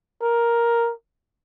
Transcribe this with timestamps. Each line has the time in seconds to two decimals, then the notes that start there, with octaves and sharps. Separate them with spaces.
0.22 A#4